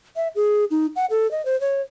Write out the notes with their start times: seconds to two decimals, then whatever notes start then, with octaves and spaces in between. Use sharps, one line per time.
0.16 E5
0.36 G#4
0.71 D#4
0.96 F#5
1.10 A4
1.31 D#5
1.45 C5
1.61 C#5